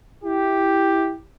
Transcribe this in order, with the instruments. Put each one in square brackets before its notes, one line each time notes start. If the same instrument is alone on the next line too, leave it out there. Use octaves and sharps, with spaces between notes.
[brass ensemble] E4 G4